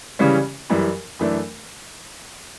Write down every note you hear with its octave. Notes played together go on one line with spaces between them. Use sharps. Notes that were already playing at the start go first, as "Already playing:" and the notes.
C#3 E3 G3 C#4
F#2 E3 G3
F#2 E3 A3 D4